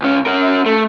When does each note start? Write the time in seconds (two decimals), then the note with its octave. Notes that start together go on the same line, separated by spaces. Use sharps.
0.02 C#2 C#4
0.26 C#4 A#4
0.66 A3